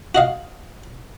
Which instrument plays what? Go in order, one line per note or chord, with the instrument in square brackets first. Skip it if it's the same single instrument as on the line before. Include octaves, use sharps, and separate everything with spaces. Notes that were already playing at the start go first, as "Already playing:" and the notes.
[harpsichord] F#4 D#5 F5